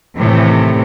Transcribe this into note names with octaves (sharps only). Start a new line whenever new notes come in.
A2 C3 D#3 E3